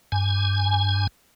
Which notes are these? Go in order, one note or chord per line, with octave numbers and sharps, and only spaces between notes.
G2 G#5